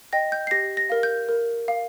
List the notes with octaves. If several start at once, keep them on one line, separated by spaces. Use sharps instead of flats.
D#5 G5 A#6
G6
C7
G4 A#6
A#6
A#4 F5
G6
A#4
F5